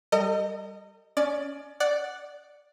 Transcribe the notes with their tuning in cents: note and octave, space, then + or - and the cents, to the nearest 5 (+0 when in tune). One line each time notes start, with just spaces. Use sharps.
G3 +0 A#4 -45 D#5 -10
C#4 +25 D5 +15
D5 +0 F#5 +0